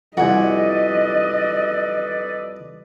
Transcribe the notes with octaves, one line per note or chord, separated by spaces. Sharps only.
C2 F2 F#4 A4 B4 D5 D#5 G#5